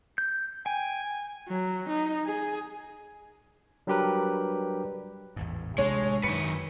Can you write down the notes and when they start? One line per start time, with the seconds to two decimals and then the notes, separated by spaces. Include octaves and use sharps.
0.18 G6
0.66 G5 G#5
1.49 F#3
1.89 D#4
2.26 G#4
3.87 F#3 G3 D4 G4 A#4 B4
5.36 A1 E2 G#2
5.78 A1 C3 G#3 D4 C#5
6.23 F#2 D#3 B4 C#7